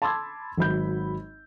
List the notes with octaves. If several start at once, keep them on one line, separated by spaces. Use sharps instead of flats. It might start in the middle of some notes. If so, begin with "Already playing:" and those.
A5 B5 C6 D6 E6 G#6
G#1 F#3 B5 G6